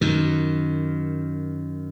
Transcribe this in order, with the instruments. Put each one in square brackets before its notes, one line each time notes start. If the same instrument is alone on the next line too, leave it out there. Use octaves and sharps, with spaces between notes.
[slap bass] F#2 D#3